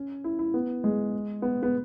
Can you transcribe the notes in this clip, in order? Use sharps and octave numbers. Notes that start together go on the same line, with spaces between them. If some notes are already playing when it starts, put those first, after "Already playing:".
Already playing: C#4
E4
E4
B3
G#3
B3
B3